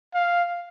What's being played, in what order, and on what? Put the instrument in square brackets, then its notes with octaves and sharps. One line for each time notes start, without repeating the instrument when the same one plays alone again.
[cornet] F5